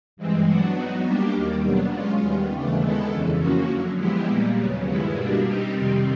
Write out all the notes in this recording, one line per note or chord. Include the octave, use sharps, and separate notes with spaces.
G2 E3 G#3 C4
F#3 B3 D4 F#4
F#3 B3 D#4 F#4
G3 A#3 D4 G4
D#2 D#3 G3 A#3
B2 F#3 B3 D4
G#3 C#4 F4
D#2 D#3 G3 B3
D#2 C#3 E3 A3 D4
D#3 G#3 B3 E4 A4
F2 C#3 E3
F3 A#3 C#4 F#4
F#2 D3 F#3
F3 G#3 B3 E4 G4
A#2 G3 A#3
D#2 C#3 F#3 B3
G2 D#3 G#3 B3 E4
B2 G3 A#3 D4
G3 C4 D#4 G4
F2 C3 D#3 G3 C4